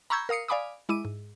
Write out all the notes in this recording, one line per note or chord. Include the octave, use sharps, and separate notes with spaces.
A#5 B5 C#6 E6 G6 G#6
A#4 F5 D#6 C7 C#7
D5 F5 G#5 B5 D6 D#6
G#3 E4 D6 D#7
G#2